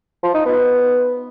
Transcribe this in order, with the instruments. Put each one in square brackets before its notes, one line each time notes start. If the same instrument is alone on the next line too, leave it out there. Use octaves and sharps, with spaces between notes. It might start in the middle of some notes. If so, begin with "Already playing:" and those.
[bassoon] F3
D#4
B3